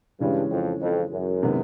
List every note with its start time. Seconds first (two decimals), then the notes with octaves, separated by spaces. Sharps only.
0.20 G2 C#3 E3 G#3 C#4
0.51 F2
0.81 F2
1.11 F#2
1.43 C3 D#3 G#3 B3